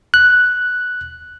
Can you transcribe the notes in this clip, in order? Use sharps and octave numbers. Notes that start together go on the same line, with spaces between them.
F#6